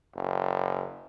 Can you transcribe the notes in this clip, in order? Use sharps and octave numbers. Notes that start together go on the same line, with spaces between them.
F#1